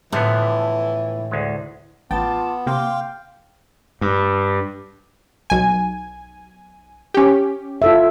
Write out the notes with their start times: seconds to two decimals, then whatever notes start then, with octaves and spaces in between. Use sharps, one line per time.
0.12 A2 D3 E3 F3 B3
1.31 D2 G#3
2.11 A1 B3 F4 G5 A5 D6 A6
2.66 C3 A#3 F5 G5 C6 D6
4.01 G2
5.50 B1 G#5
7.14 C#4 G4
7.82 F4 A4 E5